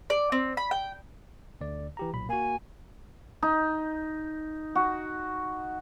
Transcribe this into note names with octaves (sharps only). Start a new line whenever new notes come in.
D5
C4
B5
G5
D2 D3 D5
E3 G4 A#5
B1 A#2 B5
A#3 F#4 G#5
D#4
F#4